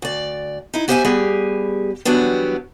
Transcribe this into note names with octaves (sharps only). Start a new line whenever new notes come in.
D2 D5
D#4 E4
B3 G4 C5 E5 F#5 G#5
G3 B3 G4 G#4
E3 F#3 G3 B3 D4